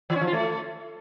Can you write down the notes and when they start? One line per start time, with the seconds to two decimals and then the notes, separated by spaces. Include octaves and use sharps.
0.10 E3
0.16 C#4
0.21 F3
0.27 F4
0.33 A3